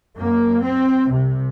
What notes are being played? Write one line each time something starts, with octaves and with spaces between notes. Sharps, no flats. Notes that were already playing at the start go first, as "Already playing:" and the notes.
F#2 A#3
C4
C2 C3